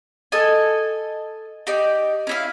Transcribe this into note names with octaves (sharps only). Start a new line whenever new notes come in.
A4 D#5 G#5
D#4 G4 D5
C#4 E4 F5